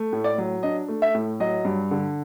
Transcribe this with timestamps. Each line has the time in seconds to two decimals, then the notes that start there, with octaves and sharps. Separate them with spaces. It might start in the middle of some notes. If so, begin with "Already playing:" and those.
Already playing: A3
0.13 A2
0.24 D5
0.38 F#3
0.63 D4 D#5
0.88 A3
1.02 E5
1.14 A2
1.40 F#3 D#5
1.65 G2
1.91 D3